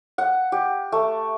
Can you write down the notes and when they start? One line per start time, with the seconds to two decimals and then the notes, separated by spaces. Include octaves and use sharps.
0.18 F#5
0.52 G4
0.92 A3